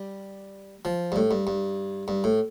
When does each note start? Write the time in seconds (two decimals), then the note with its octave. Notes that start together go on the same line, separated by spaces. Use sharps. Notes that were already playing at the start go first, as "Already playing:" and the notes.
Already playing: G3
0.85 F3
1.12 G2
1.16 A2
1.31 G2
1.47 G2
2.08 G2
2.24 A2